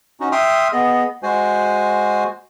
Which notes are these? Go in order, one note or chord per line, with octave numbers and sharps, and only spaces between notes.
C#4 D#4 F#4
E5 G5 C6 D#6 F6
B3 G#4 D#5
G#3 F#4 C5 G#5